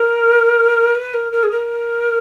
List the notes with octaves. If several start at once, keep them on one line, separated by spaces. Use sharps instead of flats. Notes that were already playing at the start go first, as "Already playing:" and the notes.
Already playing: A#4
B4
A#4
A#4
G#4
A#4